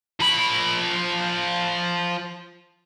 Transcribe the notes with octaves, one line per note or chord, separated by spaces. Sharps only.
F3 B5